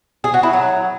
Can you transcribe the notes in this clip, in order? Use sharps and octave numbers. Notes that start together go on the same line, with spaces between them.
G#4
F#4
E4
F#3